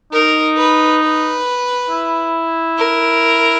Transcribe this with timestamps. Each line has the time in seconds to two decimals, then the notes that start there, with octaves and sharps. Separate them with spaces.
0.13 D#4 A#4
0.57 B4
1.01 B4
1.90 E4
2.78 A#4